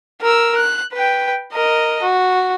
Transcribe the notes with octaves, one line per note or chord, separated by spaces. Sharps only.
A#4 E6
F#6
B4 G5
A#4 D#5
F#4